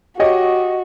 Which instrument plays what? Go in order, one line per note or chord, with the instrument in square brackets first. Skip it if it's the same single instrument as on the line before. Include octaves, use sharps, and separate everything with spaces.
[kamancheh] F#4 [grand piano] G4 C#5 D#5